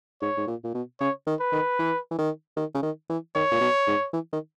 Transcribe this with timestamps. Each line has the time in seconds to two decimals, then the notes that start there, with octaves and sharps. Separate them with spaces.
0.22 G#2 C#5
0.37 G#2
0.47 A#2
0.64 A#2
0.74 B2
1.00 C#3 C#5
1.27 D#3
1.40 B4
1.52 D#3
1.79 E3
2.11 E3
2.18 D#3
2.57 D#3
2.75 C#3
2.83 D#3
3.09 E3
3.35 D#3 C#5
3.52 A#2
3.61 B2
3.87 G#2
4.13 E3
4.33 D#3